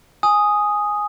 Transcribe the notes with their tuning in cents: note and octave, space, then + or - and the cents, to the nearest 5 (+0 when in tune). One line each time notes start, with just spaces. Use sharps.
G#5 +0 D#6 +0